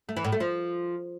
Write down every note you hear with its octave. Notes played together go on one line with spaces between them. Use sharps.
A3
E3
A2
A3
F3